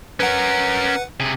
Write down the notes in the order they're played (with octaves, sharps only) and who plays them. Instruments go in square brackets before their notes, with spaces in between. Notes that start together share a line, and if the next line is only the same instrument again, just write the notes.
[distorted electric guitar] C#4 A#4 [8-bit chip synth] B4 F#5
[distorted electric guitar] C3 G#4